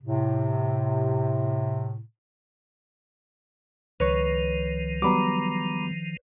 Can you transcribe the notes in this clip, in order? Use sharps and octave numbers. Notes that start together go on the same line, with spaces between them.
A2 C3
C#2 D#3 F3 B4 C#5
F#3 G3 B3 A#5 B5 D6